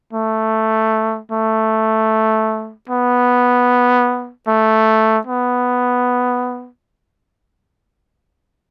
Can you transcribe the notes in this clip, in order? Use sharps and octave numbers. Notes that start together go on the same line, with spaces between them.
A3
A3
B3
A3
B3